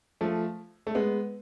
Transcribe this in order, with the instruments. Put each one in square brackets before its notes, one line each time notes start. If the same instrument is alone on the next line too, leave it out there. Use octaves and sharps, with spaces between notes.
[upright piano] F3 A3
A3
G#3 B3